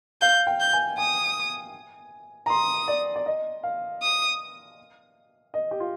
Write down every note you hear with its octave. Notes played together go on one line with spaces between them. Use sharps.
F5 G6
G5
G6
G#5
G#5 D#6
A#5
C6 D#6
D5
D5
D#5
F5
D#6
D#5
G4
F4